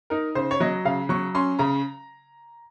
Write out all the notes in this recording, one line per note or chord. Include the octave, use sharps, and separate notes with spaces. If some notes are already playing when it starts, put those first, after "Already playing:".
D#4 A#4
C#3 C5
C#5
F#3 D#5
C#3 F5
F#3 C#6
C#4 C6
C#3 A#5